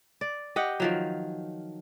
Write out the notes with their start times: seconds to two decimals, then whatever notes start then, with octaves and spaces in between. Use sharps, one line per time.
0.21 D5
0.56 G4 D#5 F#5
0.80 D#3 F3 F#3